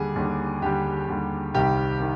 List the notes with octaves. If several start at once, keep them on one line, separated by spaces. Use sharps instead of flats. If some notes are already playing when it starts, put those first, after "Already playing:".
Already playing: D#2 D3 G3 G#4
D#2 D3 G3
D#2 D3 G3 G4
D#2 D3 G3
C2 C3 D#3 G3 G4
D#3